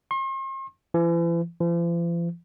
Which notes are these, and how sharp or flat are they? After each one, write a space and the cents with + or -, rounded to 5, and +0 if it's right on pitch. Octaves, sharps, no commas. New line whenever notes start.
C6 +45
E3 +40
F3 -45